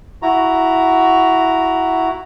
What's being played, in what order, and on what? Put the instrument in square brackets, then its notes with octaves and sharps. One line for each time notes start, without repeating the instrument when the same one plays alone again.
[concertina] E4 F#4 A#5